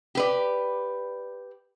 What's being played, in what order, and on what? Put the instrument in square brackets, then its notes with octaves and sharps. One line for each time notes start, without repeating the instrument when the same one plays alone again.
[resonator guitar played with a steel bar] G4 B4 D5